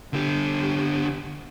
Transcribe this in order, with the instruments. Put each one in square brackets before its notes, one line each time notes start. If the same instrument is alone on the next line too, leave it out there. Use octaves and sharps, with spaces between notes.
[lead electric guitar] D3 G4